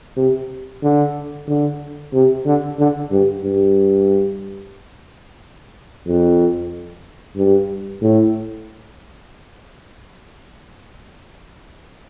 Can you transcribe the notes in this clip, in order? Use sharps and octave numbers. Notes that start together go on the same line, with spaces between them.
C3
D3
D3
C3
D3
D3
G2
G2
F2
G2
A2